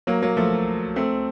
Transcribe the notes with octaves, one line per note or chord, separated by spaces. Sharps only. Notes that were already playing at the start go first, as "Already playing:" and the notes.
F#3 A#3
F#3 A#3
F3 A3
A3 C4